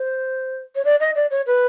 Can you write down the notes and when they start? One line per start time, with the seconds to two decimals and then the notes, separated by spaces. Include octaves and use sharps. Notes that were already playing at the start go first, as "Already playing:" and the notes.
Already playing: C5
0.75 C#5
0.85 D5
1.00 D#5
1.16 D5
1.31 C#5
1.47 B4